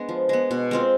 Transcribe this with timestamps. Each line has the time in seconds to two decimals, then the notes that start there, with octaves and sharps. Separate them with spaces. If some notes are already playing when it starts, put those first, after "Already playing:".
Already playing: G#3 B3 D4
0.09 F3
0.29 G#3 B3
0.51 B2
0.71 G#3 C4 F4